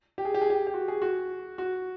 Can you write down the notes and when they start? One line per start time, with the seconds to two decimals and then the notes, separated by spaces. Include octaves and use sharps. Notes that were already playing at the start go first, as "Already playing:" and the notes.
0.18 G4
0.25 G#4
0.34 G4
0.41 G#4
0.50 G4
0.67 G4
0.74 F#4
0.88 G#4
1.02 F#4
1.58 F#4